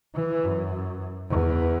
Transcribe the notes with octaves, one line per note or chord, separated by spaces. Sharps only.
E3
F#2
E2